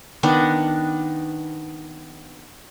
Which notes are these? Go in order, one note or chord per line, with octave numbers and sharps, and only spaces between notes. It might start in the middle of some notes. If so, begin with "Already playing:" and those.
D#3 B3 D4 F#5